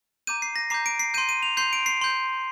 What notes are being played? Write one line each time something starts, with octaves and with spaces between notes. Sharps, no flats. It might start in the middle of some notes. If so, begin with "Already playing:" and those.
A#5 D6 G6 D#7
C7
A#6
A#5 D6 G6 C7
D7
C7
C6 G6 D#7
D#7
F7
C6 G6 C7
D7
C7
C6 G6